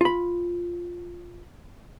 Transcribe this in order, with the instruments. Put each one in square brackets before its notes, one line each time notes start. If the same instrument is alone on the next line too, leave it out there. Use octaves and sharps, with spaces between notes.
[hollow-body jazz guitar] F4 B5